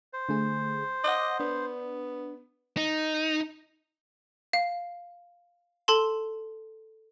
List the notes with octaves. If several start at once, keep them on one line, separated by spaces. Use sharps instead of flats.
C5
D3 A3 G#4
D#5 F#5 D6
B3 D4
D#4
F5
A4 A5 C6